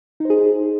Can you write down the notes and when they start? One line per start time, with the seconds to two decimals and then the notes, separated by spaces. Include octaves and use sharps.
0.20 D#4
0.25 C5
0.30 G#4